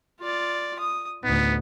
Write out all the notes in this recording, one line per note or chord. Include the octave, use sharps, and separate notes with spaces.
F4 D5
D#6
A1 D2 B3 D#4